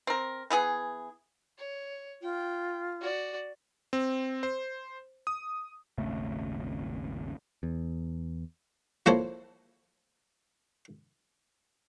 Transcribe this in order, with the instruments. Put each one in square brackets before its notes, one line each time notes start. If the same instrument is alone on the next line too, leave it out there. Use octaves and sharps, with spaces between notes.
[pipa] C4 A#4
E3 B3 G#4
[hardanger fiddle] C#5
[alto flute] F4 [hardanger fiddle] G5
[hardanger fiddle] F#4 D5
[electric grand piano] C4
C5
D#6
[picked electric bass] D#1 G#1 C#3 A3
E2
[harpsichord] F3 A#3 E4 A4 C5 C#5